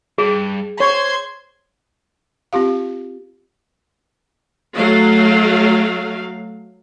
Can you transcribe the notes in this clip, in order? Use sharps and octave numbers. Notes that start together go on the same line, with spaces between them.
G2 G#4
C5 C#5 C6 G#6
C4 F4 G4 F5
F#3 A3 F5